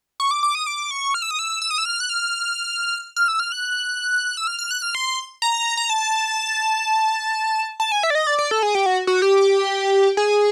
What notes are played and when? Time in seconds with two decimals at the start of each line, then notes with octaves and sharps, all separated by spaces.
0.20 C#6
0.31 D6
0.43 D6
0.55 D#6
0.67 D6
0.91 C#6
1.14 F6
1.22 E6
1.31 D#6
1.39 E6
1.62 E6
1.71 D#6
1.78 E6
1.85 F6
2.00 F#6
2.10 F6
3.16 F6
3.28 E6
3.40 F6
3.52 F#6
4.37 E6
4.47 F6
4.59 F6
4.71 F#6
4.82 F6
4.95 C6
5.42 A#5
5.77 A#5
5.90 A5
7.80 A5
7.92 G#5
8.03 E5
8.10 D5
8.15 D#5
8.27 D5
8.39 D5
8.51 A4
8.63 G#4
8.75 G4
8.86 F#4
9.07 F#4
9.22 G4
10.17 G#4